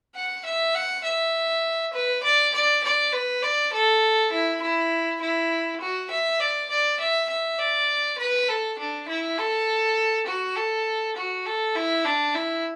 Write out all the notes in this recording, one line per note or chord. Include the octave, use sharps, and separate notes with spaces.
F#5
E5
F#5
E5
B4
D5
D5
D5
B4
D5
A4
E4
E4
E4
F#4
E5
D5
D5
E5
E5
D5
B4
A4
D4
E4
A4
F#4
A4
F#4
A4
E4
D4
E4